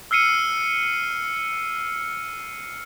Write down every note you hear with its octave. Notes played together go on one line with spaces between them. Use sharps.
E6 F6 C7 C#7 D#7